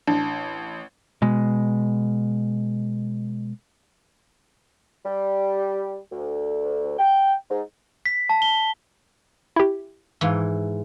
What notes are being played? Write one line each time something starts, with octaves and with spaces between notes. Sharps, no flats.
A1 D4 A5
B2 G#3
G3
D2
G5
G#2
B6
A5
G7
E4 G4
G#2 E3